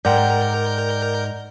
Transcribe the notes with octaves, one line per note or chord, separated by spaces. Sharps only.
G#2 A#4 D5 F#5 G5 G6